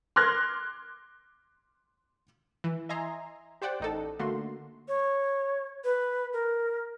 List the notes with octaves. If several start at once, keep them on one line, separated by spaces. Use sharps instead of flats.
C6 D6 F6 F#6 G#6 A#6
E3
D#5 E5 G#5 A#5 C6
G4 C5 D5 F#5 G5
A1 D#4 A4
D3 A3 A#3 F#4 C6
C#5
B4
A#4